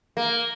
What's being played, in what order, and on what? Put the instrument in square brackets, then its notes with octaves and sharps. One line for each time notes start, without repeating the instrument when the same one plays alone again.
[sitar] A#3